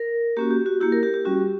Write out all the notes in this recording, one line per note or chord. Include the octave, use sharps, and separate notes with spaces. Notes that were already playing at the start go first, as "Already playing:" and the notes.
Already playing: A#4
A#3 C#4 F#4 G4
G4
F#4
A#3 E4 G4
A#4
G4
G4
G3 C#4 F#4